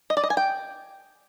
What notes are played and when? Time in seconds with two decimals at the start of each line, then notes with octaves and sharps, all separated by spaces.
0.10 D#5
0.17 D5
0.23 D#5
0.30 G#5
0.37 G5